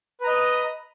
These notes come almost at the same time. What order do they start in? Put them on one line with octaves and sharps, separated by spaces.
B4 A#5 D#5